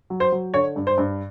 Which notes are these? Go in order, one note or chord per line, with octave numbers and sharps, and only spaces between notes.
F#3
C5
F#3
D3 C#5
G2
C5
G2